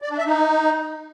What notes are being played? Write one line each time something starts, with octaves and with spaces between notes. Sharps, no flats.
D5
D4
E5
D#4